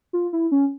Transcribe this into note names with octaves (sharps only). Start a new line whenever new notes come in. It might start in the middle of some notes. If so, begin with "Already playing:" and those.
F4
E4
C#4